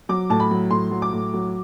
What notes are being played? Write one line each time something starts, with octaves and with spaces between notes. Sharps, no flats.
F#3 D6
A2 A5
B5
F#3
A2 C6
F#3
D6
A2
F#3